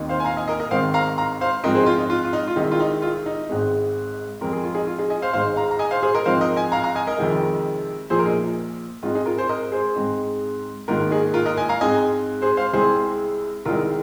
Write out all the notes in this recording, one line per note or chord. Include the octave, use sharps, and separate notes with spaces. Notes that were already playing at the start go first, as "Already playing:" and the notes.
Already playing: D#2 D#3 C4 D#4
C5 F5
G#5
F5 A#5
D#5 G#5
A#4 D#5
A#4 D#5
G#1 G#2 D#3 C4 D#4 C5 F5
F5 A#5
F5 A#5
C5 F5
G#2 F3 C4 D#4 A#4 D#5
G#4 C5
D#4
F4
D#4
F4
F4
D#4
F4
C2 C3 D#3 G#3 D#4
F4
D#4
F4
D#4
G#1 G#2 G#3 C4
F2 F3 G#3 C4 A#4
G#4
F4
D#4 G#4
F4
D#4 G#4
D#5 G#5
C5 F5
G#1 G#2 G#3 D#4 C5 F5
F5 A#5
A#5
D#5 G#5
C5 F5
G#4 C5
A#4 D#5
G#2 F3 C4 D#4 C5 F5
A#4 D#5
D#5 G#5
F5 A#5
F5 A#5
D#5 G#5
A#4 D#5
F2 C3 D#3 G#3
A#1 A#2 F3 G#4 C5
A#4
D#4 G#4
G#2 G#3 C4 D#4 F4
D#4 G#4
F4 A#4
G#4 C5
A#4 D#5
G#4 C5
G#2 G#3 C4 D#4
G#2 D#3 A#3 D#4 F4 A#4
D#4 G#4
F4 A#4
A#4 D#5
D#5 G#5
F5 A#5
G#2 G#3 C4 D#4 D#5 G#5
G#4 C5
C5 F5
C2 C3 G#3 G#4 C5
C2 C3 D#3 G#3 D#4 F4 A#4